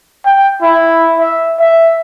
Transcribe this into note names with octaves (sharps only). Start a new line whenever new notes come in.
G5
E4
E5
E5